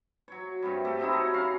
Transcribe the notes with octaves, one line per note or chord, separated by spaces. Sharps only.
F#3 C#5
G2 C3 G3
A3 G4 A4
F#3 C4 D#4 E4
C#5 A#5
F#2 C#4 F5